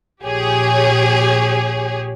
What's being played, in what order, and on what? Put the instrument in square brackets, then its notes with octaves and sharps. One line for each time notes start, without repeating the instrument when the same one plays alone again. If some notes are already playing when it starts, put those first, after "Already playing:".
[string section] A#1 G4 G#4 C#5